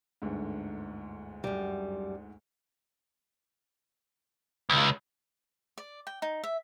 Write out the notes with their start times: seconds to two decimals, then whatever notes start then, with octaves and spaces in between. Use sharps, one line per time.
0.22 G1 D2 G#2
1.44 F#2 G3
4.70 C#2
5.78 D5
6.07 G5
6.22 D#4
6.44 E5